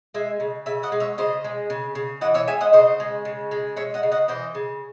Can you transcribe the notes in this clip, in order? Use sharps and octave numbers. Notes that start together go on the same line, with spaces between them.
G#3 E5 G#5
C#3
C#3 E5 G#5
D#5 F#5
G#3
C#5 E5
C#3 C5 D#5
G#3
C#3
C#3
E3 D#5 F#5
C#5 E5
G#3 E5 G#5
D#5 F#5
C#3 C5 D#5
G#3
C#3
G#3
G#3 C#5 E5
D#5 F#5
C#3
D#5 F#5
E3 C5 D#5
C#3